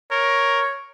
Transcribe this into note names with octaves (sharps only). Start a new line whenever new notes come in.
A#4 C#5